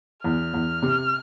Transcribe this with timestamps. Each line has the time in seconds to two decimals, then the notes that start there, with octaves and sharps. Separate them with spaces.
0.24 E2 F6
0.54 E2
0.82 C3